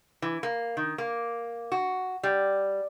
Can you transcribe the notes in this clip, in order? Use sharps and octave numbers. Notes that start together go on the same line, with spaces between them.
E3
A#3
D#3
A#3
F#4
G3